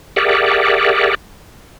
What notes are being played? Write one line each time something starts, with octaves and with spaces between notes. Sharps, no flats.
G4 G#4 A#4 D5 E5 F#5